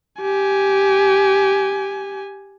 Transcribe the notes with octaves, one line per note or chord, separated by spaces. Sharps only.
G4 G#5